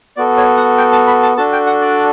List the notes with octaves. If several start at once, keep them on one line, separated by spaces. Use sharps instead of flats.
B3 F#4 A4 D5
C#5
F#5
G5
A5
B5
A5
D4 F#4 A4 A5
G5
F#5
D5